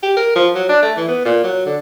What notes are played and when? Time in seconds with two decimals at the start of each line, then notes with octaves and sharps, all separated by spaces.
0.03 G4
0.17 A#4
0.36 F3
0.55 F#3
0.69 D4
0.83 A3
0.97 E3
1.08 B3
1.25 A#2
1.44 F#3
1.66 D3